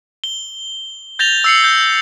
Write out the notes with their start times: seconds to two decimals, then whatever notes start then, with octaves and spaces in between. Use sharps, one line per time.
0.24 G7
1.19 G6 A6 A#6 F7 G7
1.44 E6 C7 C#7
1.64 G6